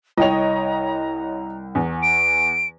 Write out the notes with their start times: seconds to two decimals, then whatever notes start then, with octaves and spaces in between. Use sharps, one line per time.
0.18 C2 C#5 D#5 G5 A#5 F7
1.75 E2
2.02 D7